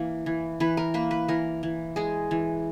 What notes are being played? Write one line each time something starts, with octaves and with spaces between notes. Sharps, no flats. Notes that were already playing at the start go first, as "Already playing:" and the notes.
Already playing: E3 A#3
E3
E3 B4
A#4
A#3 B4
B4
E3 A#4
E3
G#3 G#4
E3